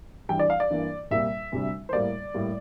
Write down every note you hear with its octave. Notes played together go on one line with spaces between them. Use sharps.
G2 E3 G3 G5
D5
F5
D5
G2 E3 A#3
C2 A#2 G3 A#3 E5
D2 C3 G3
C5
A2 G3 A#3 D5
A2 G3 A#3